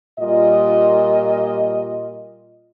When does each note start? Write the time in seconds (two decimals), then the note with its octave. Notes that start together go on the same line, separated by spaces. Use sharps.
0.19 A#2 G3 F4 D#5